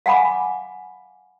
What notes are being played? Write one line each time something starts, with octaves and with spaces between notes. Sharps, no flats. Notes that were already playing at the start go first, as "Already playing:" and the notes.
F5 F#5 G#5 B5 D6